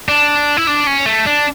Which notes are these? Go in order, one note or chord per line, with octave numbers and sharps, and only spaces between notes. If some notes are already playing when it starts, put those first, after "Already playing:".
D4
E4
D4
C#4
A3
D4